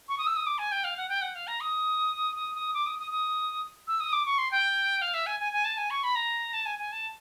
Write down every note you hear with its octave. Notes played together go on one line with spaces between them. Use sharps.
C#6
D#6
E6
D#6
D6
G#5
G5
F5
F#5
G5
F#5
F5
A#5
D#6
D#6
D#6
D6
D#6
D#6
D#6
E6
D#6
D6
C#6
C6
G5
F5
E5
G#5
G#5
G#5
A5
G#5
C#6
B5
A#5
A5
G#5
G#5
A5